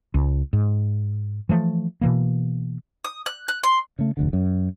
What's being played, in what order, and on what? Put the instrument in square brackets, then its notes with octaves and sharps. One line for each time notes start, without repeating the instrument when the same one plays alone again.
[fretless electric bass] C#2
G#2
E3 F3 A3
B2 E3 A#3
[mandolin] D#6
F#6
F#6
C6
[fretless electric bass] C#3 A3
F1 D2 D3
F#2